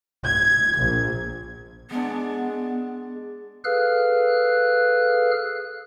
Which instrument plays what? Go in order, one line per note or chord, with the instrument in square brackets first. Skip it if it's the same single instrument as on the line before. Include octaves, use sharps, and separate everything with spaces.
[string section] G#6
A#1
[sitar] G#3 D4 [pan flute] B3
[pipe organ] G#4 A4 B4 F5 F6 F#6